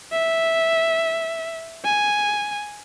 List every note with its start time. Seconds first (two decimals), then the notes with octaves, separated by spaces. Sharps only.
0.12 E5
1.85 G#5